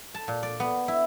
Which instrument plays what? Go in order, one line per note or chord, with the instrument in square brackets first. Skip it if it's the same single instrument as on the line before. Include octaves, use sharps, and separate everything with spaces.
[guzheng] A5
A#2
D5
B3
E4